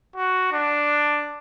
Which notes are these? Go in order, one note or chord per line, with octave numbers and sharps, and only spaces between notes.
F#4
D4